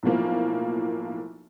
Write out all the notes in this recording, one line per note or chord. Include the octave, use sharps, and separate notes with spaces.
B1 A2 F3 A#3